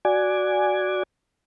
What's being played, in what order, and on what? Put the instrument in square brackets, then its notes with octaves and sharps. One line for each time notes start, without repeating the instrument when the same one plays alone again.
[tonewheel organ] F#4 D5 G#5